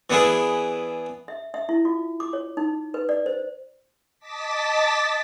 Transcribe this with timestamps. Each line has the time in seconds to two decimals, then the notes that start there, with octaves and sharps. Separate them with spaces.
0.10 E3 B3 D4 E4 G#4
1.28 E5
1.54 E5
1.69 E4
1.85 F4
2.20 D6
2.33 C#5
2.57 D#4
2.94 B4
3.09 D5
3.26 C5
4.19 D#5 A5 D6 A6 B6